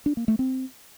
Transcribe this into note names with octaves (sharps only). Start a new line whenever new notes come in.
D4
A#3
A3
C4